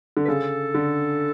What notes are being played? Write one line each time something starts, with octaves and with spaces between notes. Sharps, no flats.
D3
B4
C#3 A4
D3